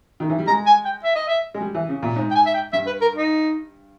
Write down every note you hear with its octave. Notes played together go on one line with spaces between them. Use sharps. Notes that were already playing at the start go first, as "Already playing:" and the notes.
D#3
E3
G3
G#3 A#5
G#5
G5
E5
D#5
E5
G#3
G3
E3
C#3
A#2
G#2
G5
G#5
E5
G5
G2 E5
B4
A#4
D#4